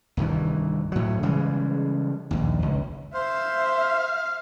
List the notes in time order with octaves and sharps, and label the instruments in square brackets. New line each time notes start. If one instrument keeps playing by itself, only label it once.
[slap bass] C2 G2 D#3 E3
A2 F#3
C#3 E3 G3 G#3
A#1 D#2
C#2
[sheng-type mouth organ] C5 [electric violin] E5 [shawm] F5